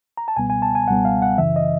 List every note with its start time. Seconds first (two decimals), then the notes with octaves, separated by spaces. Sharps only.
0.17 A#5
0.28 A5
0.36 C#2 B2 G3 B3 G#5
0.50 G#5
0.62 A5
0.75 G#5
0.88 C#2 B2 G3 B3 F#5
1.05 F5
1.22 F#5
1.38 F#2 C#3 E3 E5
1.56 D#5